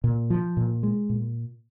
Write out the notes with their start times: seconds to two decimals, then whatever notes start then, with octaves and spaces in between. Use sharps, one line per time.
0.04 A#2
0.30 F3
0.57 A#2
0.83 G#3
1.09 A#2